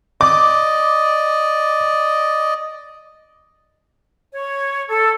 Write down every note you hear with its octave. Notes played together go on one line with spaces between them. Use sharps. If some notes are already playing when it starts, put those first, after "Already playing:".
D5 D#5 D6
C#5
A4